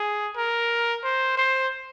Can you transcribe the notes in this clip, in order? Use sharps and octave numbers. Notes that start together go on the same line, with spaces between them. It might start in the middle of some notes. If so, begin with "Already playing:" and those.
Already playing: G#4
A#4
C5
C5